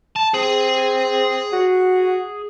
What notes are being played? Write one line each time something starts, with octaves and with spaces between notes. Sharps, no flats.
A5
C4 G#4
F#4